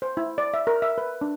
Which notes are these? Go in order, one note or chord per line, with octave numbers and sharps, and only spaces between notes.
C5
E4
D5
E5
A#4
E5
B4
D4